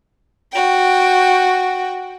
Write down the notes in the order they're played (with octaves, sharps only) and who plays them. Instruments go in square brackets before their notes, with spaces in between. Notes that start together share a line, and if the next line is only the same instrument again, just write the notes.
[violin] F#4 G5